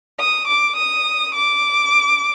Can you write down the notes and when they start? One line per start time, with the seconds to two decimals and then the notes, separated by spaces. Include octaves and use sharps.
0.18 D#6
0.46 D6
0.76 D#6
1.33 D6